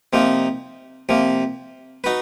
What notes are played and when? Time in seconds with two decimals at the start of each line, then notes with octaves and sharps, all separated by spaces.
0.13 C3 F3 A#3 D#4
1.09 C3 F3 A#3
2.04 D#4 F#4 B4